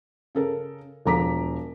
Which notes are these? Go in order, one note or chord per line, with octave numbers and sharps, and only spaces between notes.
C#3 A4 A#4
E1 F3 A#5 D6 B6